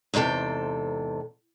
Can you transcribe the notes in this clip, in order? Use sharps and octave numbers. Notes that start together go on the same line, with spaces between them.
E2 G#2 C3 A4 G5